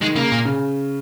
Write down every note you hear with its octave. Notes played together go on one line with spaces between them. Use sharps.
D#3 G#3
C#3 A#3
A#2
C#3